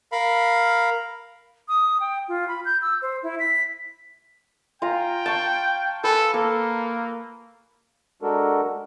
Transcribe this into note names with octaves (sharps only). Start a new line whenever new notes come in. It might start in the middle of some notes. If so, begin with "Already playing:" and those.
A#4 F5 B5
D#6
G5
F4
B5
G6
E6
C5
E4
B6
F4 G5 G#5 A#5
A5 C#6
A4 B4 G#5
A#3 A4
G#3 D4 F#4 A4 A#4